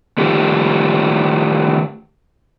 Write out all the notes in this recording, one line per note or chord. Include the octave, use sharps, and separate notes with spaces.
D#3 A3 F4 G4